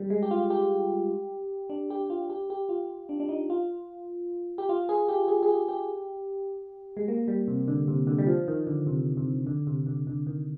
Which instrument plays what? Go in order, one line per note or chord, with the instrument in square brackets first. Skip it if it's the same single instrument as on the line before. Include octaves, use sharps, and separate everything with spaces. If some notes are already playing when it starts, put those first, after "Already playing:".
Already playing: [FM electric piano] G3
G#3
G4
F4
G4
D4
G4
F4
G4
G4
F4
D4
D4
D#4
F4
G4
F4
G#4
G4
G#4
G#4
G4
G4
G#3
A#3
G3
C3
D3
C3
D3
G3
F3
D#3
D3
C3
C3
D3
C3
D3
D3
D#3